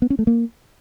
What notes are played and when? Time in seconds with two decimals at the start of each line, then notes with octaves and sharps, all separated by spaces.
0.02 B3
0.10 C#4
0.19 A3
0.27 A#3